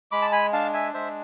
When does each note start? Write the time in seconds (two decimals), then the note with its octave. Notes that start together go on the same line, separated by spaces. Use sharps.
0.12 G#3 B5 D6
0.22 A5
0.32 G#5 B5
0.53 D4 F5 A5
0.73 E5 G#5
0.94 G#3 C5 E5